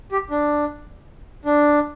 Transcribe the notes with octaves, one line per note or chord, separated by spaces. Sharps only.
G4
D4
D4